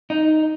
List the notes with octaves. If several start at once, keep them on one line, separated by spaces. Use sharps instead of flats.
D#4